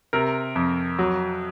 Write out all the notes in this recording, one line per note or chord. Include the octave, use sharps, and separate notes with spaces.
C3 A#4
F2
F#3